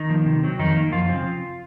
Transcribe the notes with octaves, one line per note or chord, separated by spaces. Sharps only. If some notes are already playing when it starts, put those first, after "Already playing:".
Already playing: D#3 D#4
F3 A#3
C3
F#3 C4
F2 D#3 D#4
D#3 A#3
F#2 F3 F4
C#3 F3 C4